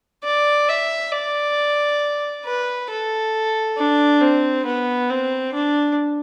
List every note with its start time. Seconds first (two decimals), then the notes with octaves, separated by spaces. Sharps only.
0.24 D5
0.69 E5
1.12 D5
2.45 B4
2.90 A4
3.77 D4
4.21 C4
4.65 B3
5.10 C4
5.54 D4